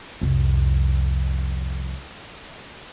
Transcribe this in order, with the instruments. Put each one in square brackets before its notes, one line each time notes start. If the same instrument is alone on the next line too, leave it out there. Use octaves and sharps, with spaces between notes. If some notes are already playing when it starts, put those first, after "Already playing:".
[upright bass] C2 F2